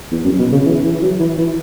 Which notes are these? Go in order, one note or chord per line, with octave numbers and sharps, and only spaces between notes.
E2
F#2
B2
C#3
E3
E3
F#3
E3
E3